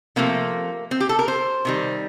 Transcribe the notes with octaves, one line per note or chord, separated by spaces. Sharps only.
C3 F3 A3 A#3
C4
G4
A4
A#4
C5
C3 D#3 G3